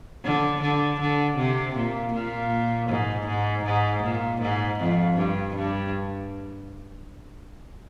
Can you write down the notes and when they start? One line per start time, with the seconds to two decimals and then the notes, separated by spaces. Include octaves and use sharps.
0.24 D3
0.61 D3
1.00 D3
1.37 C3
1.75 A#2
2.13 A#2
2.89 G#2
3.27 G#2
3.65 G#2
4.03 A#2
4.41 G#2
4.79 F2
5.17 G2
5.55 G2